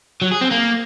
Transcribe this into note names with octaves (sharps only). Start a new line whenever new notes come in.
F#3
G#4
C4
A#3